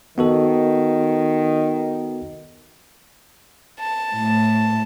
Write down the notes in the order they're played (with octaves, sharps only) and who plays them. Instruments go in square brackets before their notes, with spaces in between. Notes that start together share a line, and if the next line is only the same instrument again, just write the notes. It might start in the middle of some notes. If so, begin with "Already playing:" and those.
[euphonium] D#3 [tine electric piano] B3 F#4 A4
[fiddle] A5
[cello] A2 A3